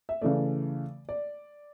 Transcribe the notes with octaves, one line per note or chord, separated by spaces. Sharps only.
E5
C#3 E3 A3 D5
D5